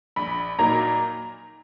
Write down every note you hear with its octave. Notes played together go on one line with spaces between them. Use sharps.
A#1 B5
A#2 F#3 A#3 D#4 A#5